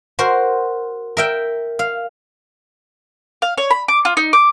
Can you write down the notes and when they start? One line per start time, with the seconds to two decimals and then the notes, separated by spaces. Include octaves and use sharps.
0.19 F#4 A#4 C5
1.17 A#4 E5 G5
1.79 F5
3.42 F5
3.58 C#5
3.71 B5
3.88 D6
4.05 F4
4.17 D#4
4.33 D6